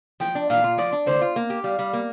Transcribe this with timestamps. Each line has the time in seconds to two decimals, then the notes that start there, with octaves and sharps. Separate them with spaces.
0.20 F3 G5
0.35 D4
0.50 A#2 F5
0.64 F4
0.78 F3 D5
0.92 D4
1.07 D3 C5
1.21 F4
1.36 A#3
1.50 G4
1.64 G3 F5
1.79 G3
1.93 A#3